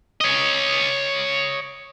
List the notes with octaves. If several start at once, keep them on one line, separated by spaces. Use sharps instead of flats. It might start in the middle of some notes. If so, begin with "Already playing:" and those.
C#5 D#5